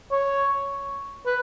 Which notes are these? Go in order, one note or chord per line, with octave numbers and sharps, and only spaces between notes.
C#5
B4